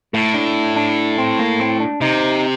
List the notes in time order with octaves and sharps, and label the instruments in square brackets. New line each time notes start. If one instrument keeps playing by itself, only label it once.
[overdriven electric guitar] A2 [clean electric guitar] A3
[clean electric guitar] D4
D4
C4
A#3
C4
D4
[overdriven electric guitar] C3 [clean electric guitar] D#4